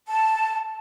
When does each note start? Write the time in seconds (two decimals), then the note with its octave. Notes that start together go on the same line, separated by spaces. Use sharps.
0.07 A5